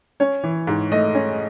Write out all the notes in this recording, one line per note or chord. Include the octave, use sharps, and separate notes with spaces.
C#4 C#5
E3
G#2
A3 D#5
C#4